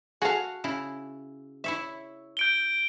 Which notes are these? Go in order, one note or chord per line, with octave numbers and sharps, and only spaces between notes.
F#4 G#4 A4 F5
C#3 E4
E4 C#5 E5
G6 D7 G7